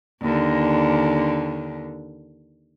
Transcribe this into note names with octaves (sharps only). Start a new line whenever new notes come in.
D#2 D3